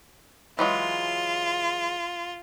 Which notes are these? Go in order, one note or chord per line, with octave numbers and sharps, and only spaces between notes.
E3 F#3 G#3 F4